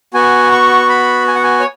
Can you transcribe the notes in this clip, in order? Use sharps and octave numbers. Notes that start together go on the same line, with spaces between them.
B3 F#4 G#5
C#6
B5
G#5
F#5
G#5
C#5